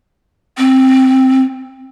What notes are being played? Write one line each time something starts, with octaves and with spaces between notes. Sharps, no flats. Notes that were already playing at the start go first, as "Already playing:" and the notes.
C4